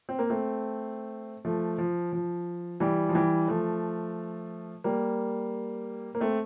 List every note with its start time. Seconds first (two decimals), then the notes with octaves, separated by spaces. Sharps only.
0.09 C4
0.19 A#3
0.30 A3 C4
1.45 F3 A3
1.78 F3
2.13 F3
2.80 E3 G3
3.09 F3
3.15 E3 G3
3.48 F3 A3
4.84 G3 A#3
6.15 A#3
6.20 A3 C4